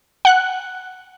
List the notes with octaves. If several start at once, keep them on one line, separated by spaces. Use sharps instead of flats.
F#5 F#6